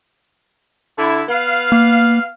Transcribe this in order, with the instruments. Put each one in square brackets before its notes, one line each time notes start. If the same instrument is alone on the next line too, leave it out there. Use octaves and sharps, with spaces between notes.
[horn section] D3 E4
B3 F5
[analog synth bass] A#3